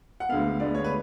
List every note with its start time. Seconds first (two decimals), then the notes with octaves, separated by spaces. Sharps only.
0.20 F#5
0.29 D2 D3 G#3 B3 F5
0.59 D2 D3 G#3 B3 D5
0.75 C#5
0.84 B4